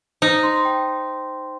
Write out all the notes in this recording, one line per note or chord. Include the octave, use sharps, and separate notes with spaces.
D#4 C5
C6
G5